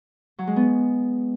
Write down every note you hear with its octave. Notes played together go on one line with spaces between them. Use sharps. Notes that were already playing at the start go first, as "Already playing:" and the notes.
F#3
G#3
B3